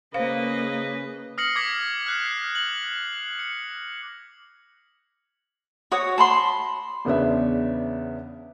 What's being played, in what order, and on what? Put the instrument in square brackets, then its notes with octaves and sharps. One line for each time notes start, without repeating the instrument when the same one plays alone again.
[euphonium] C#3 [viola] A#3 D#5 [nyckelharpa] B4 [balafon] C5 F5
[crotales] D#6 F6 A#6 C7 C#7 F#7
D6 G#6 A#6 B6
F6 F#6 C7
F#7
C#7
[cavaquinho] F#4 C#5 D#6
A5 B5 C6
[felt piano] E2 C#3 B3 D4 E5